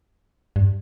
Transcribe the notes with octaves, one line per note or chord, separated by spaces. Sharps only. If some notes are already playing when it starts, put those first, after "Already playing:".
G2